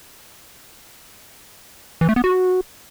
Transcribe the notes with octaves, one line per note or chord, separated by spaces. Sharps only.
E3
A3
B3
F#4